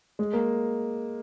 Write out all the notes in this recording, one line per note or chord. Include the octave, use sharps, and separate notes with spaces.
G#3
A#3